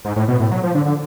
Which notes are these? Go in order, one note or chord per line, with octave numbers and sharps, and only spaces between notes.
G#2
A2
B2
A2
F#3
F3
D3
D3